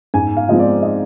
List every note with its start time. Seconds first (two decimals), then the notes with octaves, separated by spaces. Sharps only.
0.14 G#2 G#5
0.37 F5
0.48 F3 G#3 C4 D#5
0.59 D5
0.83 D#5